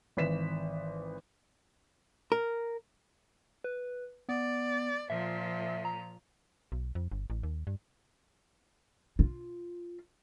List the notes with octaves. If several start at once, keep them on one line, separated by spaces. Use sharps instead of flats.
G#1 E3 B4 B6 E7
A#4
B4
B3 D5
A#2 F3 E5
A#5
B1
F2
G1
A1
D#2
G2
F4